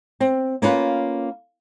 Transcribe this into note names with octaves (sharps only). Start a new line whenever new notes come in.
C4
A#3 C#4 F4 B4